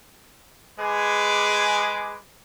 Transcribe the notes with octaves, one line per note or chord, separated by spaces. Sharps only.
G#3 G#4 B4 D6